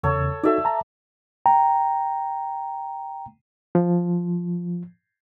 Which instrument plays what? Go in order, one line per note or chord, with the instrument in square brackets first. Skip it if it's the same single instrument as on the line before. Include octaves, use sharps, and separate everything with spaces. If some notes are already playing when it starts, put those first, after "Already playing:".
[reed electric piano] E2 C#3 [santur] A4 C#5
[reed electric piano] D#4 F#4 A4 [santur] D5 E5
[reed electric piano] A5 A#5
[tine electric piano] G5 A#5
[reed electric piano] F3